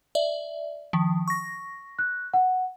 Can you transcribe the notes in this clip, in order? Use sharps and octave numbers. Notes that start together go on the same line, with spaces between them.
D5 E5
D#3 F3
C#6 A#6
F#6
F#5